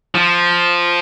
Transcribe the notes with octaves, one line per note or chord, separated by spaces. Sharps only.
F3